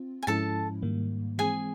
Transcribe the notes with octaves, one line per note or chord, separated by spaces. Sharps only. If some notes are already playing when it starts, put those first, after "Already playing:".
Already playing: C4 F4
G#5
G#2 F3 G#3 C#4 E4 A4 A5
G#2 D#3 G3 A#3
E3 G#3 C4 G#4 G#5